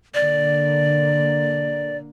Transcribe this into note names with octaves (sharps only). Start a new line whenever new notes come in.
D3 A#3 D5